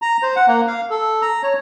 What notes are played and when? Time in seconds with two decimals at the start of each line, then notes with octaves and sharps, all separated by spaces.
0.02 A#5
0.23 C5
0.36 F#5
0.48 A#3
0.68 F5
0.90 A4
1.22 A#5
1.43 C#5